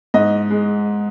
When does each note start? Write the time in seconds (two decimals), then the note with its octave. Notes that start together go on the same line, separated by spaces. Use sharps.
0.14 G#2 D#5
0.50 G#3